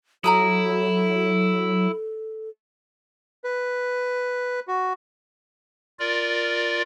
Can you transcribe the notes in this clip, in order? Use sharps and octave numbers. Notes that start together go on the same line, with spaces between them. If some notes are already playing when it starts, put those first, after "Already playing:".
F#3 E4 A4 A#5 B5 D#6
B4
F#4
F4 A#4 D5